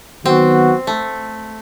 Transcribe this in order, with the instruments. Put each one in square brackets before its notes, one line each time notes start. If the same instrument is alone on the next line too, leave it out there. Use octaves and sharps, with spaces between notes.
[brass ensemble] D#3 F#3 B3 F#4 [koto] C4
[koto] A3